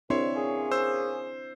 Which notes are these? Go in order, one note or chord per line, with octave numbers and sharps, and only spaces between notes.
C2 C4 D4 E4 C#5 E5 C6
A#3 C#4 G#4
C5 E6